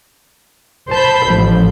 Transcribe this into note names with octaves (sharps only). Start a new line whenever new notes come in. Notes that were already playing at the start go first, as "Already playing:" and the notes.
C5 A5 B5 G6
A1 F3